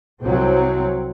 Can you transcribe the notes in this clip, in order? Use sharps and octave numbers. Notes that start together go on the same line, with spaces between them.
C2 F#3 C4